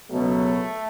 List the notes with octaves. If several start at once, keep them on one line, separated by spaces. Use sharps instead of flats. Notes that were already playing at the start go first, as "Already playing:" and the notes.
C#2 B2 F#3 A3 B3